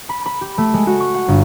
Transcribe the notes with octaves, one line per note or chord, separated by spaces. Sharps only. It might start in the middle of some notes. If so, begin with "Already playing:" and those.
B5
B5
G4
A3
G#3
F#4
C#6
F#5
G1